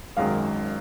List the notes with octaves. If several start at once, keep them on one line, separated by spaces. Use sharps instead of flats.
G#1 F#2 D#3 G#3 F5